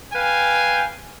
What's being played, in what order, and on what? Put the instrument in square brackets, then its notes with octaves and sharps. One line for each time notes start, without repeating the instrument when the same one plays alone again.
[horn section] B4 F5 G5 G#5